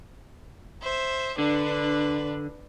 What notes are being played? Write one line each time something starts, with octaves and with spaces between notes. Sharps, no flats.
C5 E5
D3 D4 B4